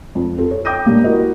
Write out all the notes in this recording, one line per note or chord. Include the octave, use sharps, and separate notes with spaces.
F2
C4 F4 A4
C#5
G5 D6 G6 A#6 D#7
A#2 G3 A#3 D4
E4 F#4 A#4 D#5